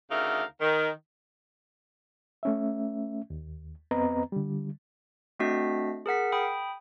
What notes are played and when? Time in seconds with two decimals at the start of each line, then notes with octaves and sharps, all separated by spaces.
0.10 D2 C#3 D#4 A#4 E5 F5
0.61 D#3
2.43 A3 C#4 E5
3.30 D#2
3.91 F2 B3 C4 B4 D#5 A#5
4.32 D3 G3
5.39 A3 C4 D4 F#4 D#5 B6
6.06 G#4 A#4 F#5 B6
6.32 G5 B5 D#6